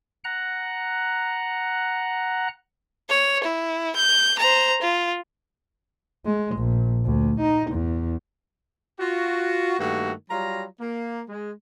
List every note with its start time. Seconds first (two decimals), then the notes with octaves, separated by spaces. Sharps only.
0.24 F#5 A#5 F#6
3.09 C#5
3.44 E4
3.96 G6
4.39 C5 A#5
4.82 F4
6.25 G#3
6.56 A#1
7.05 D2
7.40 D#4
7.71 E2
8.99 F4 F#4
9.79 G2 D#3 A3 A#3 F#4
10.30 F#3 G3 F4 A#5
10.80 A#3
11.29 G#3